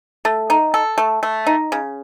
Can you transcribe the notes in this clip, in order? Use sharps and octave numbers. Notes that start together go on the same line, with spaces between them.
A3
D#4
A4
A3
A3
D#4
C#3